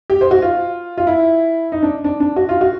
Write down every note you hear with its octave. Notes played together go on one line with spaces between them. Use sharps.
G4
C5
F#4
F4
F4
E4
D#4
D4
D4
D4
F#4
F4
F#4